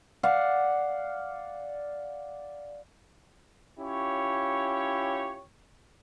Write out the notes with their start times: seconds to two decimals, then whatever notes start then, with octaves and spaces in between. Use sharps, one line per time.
0.23 D5 F5 F#5
3.80 C#4 E4 F4 G4 C#5